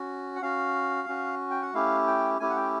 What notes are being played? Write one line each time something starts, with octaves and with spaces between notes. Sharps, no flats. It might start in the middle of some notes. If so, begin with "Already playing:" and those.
Already playing: C#4 F#4
F#5
C#4 F#4 F5
C#4 F#4
G5
F#5
A3 C#4 E4 G4 F5
G5
A3 C#4 E4 G4 G#5
F#5
G5